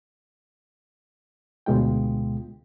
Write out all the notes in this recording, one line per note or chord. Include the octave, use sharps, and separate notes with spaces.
D2 B2 G#3 F4 G5